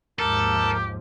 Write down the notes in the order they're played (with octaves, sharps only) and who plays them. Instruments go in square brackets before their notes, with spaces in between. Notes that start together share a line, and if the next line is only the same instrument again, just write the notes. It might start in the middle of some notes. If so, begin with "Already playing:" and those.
[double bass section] D#2 G#2 F3 [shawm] G4 [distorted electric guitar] A4 [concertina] A#4